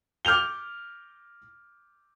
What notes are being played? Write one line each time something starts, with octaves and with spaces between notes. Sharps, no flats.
D6 F6 G6 F7 G7